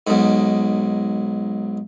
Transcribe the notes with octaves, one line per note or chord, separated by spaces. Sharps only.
B1 G#2